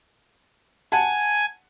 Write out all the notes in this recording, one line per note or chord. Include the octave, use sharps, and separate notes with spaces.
F#5 G#5 A5